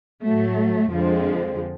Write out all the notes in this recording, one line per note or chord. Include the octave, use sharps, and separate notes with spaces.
A2 F#3 A3
F2 D3 F3 G#3 C4